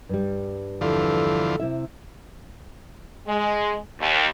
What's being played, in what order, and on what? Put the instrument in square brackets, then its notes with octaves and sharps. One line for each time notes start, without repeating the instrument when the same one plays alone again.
[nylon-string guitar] G2 G3
[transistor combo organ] E2 D3 F3 [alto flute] A4
[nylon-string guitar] C3 E4 E5
[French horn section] G#3
D#2